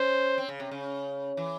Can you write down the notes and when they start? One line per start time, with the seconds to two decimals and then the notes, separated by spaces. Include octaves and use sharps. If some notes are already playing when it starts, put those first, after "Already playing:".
Already playing: C#4 C5
0.38 C4
0.49 C#3
0.60 C3
0.71 C#3
1.37 E3